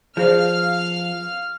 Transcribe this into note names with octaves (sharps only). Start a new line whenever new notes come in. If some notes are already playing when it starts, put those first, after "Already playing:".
F3 G#4 C5 D5 F5 F6